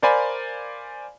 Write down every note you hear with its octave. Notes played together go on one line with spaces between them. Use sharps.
A#4 C5 D5 F5 G#5 B5